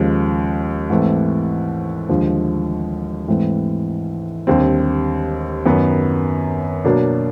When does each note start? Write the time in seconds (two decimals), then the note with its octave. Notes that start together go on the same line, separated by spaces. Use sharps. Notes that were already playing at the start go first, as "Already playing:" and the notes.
Already playing: D#2 C#3 F3 G#3
0.90 G#2 E3 A3 C4
2.09 D#2 D3 F3 G#3
3.28 G#2 E3 A3 C4
4.47 D#2 D3 G3 C4
5.66 F#2 D#3 F#3 B3
6.84 B2 F#3 A#3 D4